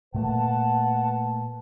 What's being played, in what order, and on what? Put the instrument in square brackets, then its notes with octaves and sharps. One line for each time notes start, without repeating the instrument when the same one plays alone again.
[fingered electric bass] A#2 A3 A#3 [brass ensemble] B4 F#5 A5